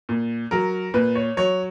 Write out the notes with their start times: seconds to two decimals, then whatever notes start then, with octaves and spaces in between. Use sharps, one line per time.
0.09 A#2
0.51 F#3 A#4
0.94 A#2 B4
1.15 C#5
1.37 F#3 C#5